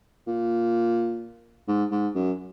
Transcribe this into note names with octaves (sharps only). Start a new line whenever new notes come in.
A#2
G#2
G#2
F#2